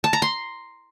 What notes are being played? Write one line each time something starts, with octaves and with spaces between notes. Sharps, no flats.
A5
A#5
C6